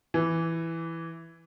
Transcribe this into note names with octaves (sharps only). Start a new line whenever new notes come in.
E3